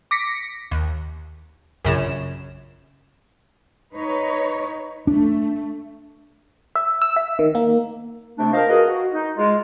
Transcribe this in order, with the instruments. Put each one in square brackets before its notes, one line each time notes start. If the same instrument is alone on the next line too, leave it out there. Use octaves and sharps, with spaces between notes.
[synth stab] D6 A#6 B6 C#7
D#2
A#1 F#2 C#3 E7
[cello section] D#4 B4 C#5
[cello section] A3 [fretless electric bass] D4
[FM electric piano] E5
E6
E5
D#3
A#3
[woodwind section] C3 A3 D4
F4 A#4 C5 D#5 F5
F4 F#4 G#4 A#4 B4 D#5
F#4
D#4
G#3 F4